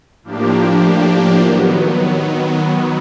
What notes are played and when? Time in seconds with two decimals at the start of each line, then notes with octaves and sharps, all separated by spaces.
0.23 A2 F3 A#3 D4 G4
1.43 D#3 F#3 B3